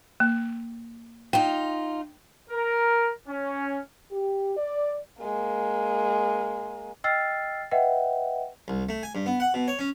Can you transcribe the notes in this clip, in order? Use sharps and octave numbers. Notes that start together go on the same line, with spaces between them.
A#3
D#4 F4 G5
A#4
C#4
G4
D5
G#3 A#3
D#5 G5 E6 F6 A6 C7
B4 D#5 E5 F#5 G5
C2
A3
G#5
G2
B3
F#5
B2
C#5
C#4